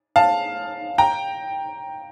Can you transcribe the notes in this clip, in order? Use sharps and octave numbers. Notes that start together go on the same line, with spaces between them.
F5 A5
G5 A#5